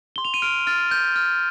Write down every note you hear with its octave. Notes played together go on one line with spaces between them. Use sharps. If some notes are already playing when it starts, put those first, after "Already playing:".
C6 G7
F7
D#7
F6 D7
F6 A6
F6 G6
F6